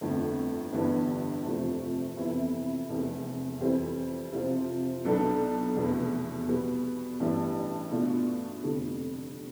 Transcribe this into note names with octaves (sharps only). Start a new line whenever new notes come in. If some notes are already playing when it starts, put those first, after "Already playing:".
G1 F2 D3 A3
G1 G2 E3 B3 D4
F2 C3 F3 A3
F2 C3 E3 B3 E4
F1 E2 C3
F2 E3 G3 C4
C3 F3 C4 F4
B1 B2 B3 D4 A4
F1 E2 B2 B3
B2 G3 B3
A1 G2 E3 G3 D4
B2 A3 D4 F4
F1 F2 D3 G3